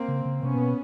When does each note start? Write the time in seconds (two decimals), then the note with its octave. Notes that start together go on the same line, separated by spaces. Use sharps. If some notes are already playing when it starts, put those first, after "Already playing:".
Already playing: A#3 C4
0.08 C#3
0.25 C#3
0.42 C3 B3 C#4
0.55 A#2
0.59 B2